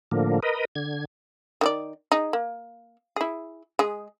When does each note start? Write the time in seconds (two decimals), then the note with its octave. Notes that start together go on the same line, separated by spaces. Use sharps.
0.12 A2 D3 F3 A#3
0.43 A#4 B4 D#5
0.76 D3 G#6
1.61 D#3 G4 D5
2.12 D#4 G#4
2.33 A#3
3.16 E4 G#4
3.79 G#3 G#4